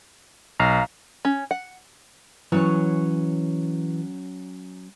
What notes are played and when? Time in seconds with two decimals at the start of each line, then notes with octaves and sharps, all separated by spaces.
0.60 B1 F5 A#5
1.25 C#4
1.51 F#5
2.52 E3 F#3 C#4 C#5